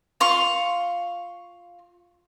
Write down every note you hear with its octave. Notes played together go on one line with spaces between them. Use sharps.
F4 F5 C6 C#6